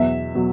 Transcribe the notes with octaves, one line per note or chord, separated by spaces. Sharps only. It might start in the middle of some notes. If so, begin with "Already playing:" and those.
Already playing: E2 B2 F#3 E5
B2 F#3